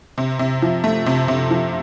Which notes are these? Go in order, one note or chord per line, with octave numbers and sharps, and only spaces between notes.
C3
C3
F3
A3
C3
C3
F3